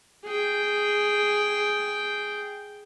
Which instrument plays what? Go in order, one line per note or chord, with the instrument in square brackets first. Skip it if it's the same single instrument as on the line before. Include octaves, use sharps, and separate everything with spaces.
[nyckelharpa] G#4 G5